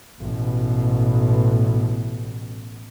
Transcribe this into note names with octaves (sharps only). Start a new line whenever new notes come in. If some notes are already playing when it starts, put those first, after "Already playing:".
A1 B2